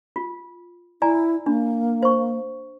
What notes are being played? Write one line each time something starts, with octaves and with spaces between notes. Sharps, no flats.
F4
E4 D5 G#5 A#5
A#3 D4
C5 C#6